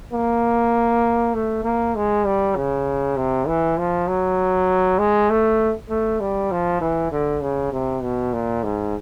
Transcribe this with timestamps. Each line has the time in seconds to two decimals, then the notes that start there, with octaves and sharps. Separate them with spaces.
0.13 A#3
1.34 A3
1.64 A#3
1.95 G#3
2.26 G3
2.56 C#3
3.17 C3
3.47 E3
3.78 F3
4.08 F#3
4.98 G#3
5.30 A3
5.89 A3
6.20 G3
6.51 F3
6.81 E3
7.11 D3
7.42 C#3
7.72 C3
8.02 B2
8.33 A#2
8.63 G#2